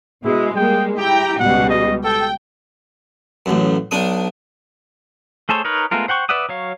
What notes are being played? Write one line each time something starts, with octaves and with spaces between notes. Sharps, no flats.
B2 G#3 E4
G3 G#3 A#3 G5
E4 G4 G5 A#5
C#2 B2 G3 F#5
D#5
A4 G5
A1 F#2
B1 D4 D#6
A3 G#4 A4 C5 C#5
D#4 A#4 B4 C#5
G#3 A3 B3 F4 A#4
C5 F#5 G5 C#6
B4 D5 E5 F#5 D#6
F#3 C#5 F5